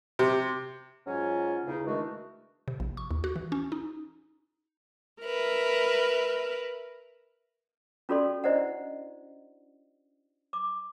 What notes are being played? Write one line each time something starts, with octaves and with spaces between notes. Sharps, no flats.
C3
G#2 F#3 C#4 F4 G#5
E2 C#3 D#4
D#3 E3 G#3 A3 D4 F#4
C3
A#1
C#6
D#2
F#4
E3
C#4
D#4
A#4 B4 E5
C#4 F4 F#4 A4 D5 C6
D4 E4 C5 D5 D#5 F#5
D6